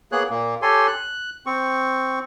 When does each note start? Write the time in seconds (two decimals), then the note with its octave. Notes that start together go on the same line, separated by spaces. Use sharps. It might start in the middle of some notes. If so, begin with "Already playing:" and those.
0.12 A#3 B3 G#4 C#5 F#6
0.30 A#2 A#3
0.62 G4 A4 C#5 G#5 C6
0.87 F#6
1.46 C4 C#6